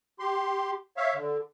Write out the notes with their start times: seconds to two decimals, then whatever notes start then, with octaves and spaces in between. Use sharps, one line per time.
0.19 G4 C6
0.97 C#5 E5 F5
1.14 D3